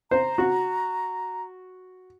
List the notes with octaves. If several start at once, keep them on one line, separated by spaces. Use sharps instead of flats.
C5 A#5
F#4